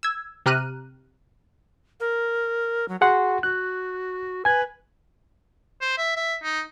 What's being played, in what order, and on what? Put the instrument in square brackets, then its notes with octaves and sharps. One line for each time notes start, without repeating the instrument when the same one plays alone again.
[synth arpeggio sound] E6 G#6
C3 G4 A#5 F6 F#6 D#7
[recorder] A#4
F#3
[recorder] F#4 [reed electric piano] G#4 F#5 C6
[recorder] F#4 [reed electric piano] F#6
[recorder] B4 [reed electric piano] G#5 G#6
[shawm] C5
E5
E5
D#4